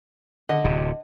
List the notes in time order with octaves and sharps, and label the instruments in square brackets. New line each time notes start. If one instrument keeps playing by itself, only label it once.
[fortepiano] D3 [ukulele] D#5
[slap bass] D1 C3